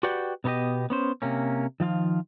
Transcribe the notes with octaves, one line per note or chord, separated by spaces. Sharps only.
F#4 G4 B4 D5 F#5 G5
B2 B3 D#4 G4 D#5
B3 C#4 C5
C3 A#3 C#4
D#3 F3 F4 F5